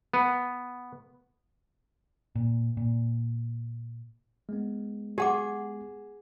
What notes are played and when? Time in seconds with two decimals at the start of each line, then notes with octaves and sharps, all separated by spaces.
0.14 B3
2.35 A#2
2.77 A#2
4.49 G#3 B3
5.18 G4 G#4 F#5 D6